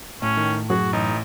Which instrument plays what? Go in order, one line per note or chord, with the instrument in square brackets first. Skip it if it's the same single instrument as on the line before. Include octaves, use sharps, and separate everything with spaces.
[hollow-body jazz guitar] A2 [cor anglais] C#4
[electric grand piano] D#3
[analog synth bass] F#2 [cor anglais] F#4 [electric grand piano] G#4
[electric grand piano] A1 [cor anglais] D#4